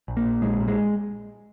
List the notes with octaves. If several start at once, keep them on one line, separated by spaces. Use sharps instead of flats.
A#1
A#3
A#2
A#1 G#3
A#2
G#3